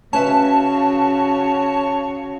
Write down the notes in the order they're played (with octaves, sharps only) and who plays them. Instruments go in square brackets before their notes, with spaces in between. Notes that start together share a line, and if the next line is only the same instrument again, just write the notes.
[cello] C#3 F#4 [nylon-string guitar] C#4 B4 E5 [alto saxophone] C#5 [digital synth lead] A5